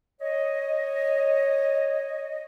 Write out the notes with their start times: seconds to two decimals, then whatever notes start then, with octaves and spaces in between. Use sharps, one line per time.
0.20 C#5 D#5